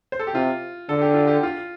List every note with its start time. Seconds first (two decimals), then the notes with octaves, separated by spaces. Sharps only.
0.12 C5
0.19 A4
0.27 G4
0.34 C3 F4
0.89 D3 A4
1.02 G4
1.14 F4
1.27 G4
1.43 F4